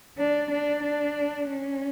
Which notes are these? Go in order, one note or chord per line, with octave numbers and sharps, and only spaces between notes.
D4
D4
D4
C#4